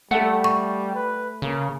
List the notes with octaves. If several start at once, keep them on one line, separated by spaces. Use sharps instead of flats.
G3 A3 A4 E5 F#5
C#6
B4
C#3 A#3